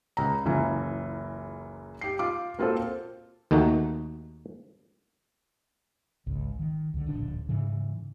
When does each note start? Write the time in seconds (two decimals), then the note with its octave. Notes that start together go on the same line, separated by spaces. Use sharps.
0.17 C#2 A#5
0.45 F#1 C#2 E3 F4 E5 A#5
2.01 G4 C7
2.19 F4 D6
2.59 A#3 C4 F4 F#4 A4 C5
3.51 D#2 D#3 A3 D#4 F#4
6.26 G#1 C#2
6.59 D#3
6.94 C#2 D3
7.06 D1 A#1 D3 D4
7.49 G#2 C#3 E3